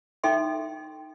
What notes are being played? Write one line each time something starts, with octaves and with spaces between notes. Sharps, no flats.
D#4 A4 E5 G5 C6